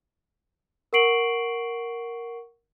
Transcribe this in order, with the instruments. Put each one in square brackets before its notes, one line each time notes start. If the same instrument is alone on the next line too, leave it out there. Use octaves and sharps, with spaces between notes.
[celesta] A#4 F#5 C#6 C7 D7 F#7